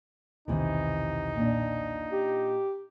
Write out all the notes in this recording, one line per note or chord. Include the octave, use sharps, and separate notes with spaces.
E1 B1 C3 D#3 E3 D#4
A#2 D4
G4